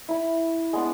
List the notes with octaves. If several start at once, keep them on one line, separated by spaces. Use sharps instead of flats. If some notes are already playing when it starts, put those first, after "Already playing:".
E4 B5
G#3 B3 D4